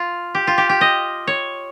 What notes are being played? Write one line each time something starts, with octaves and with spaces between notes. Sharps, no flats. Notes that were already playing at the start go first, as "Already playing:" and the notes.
Already playing: F4
G4
F4
G4
G4
D#5
C#5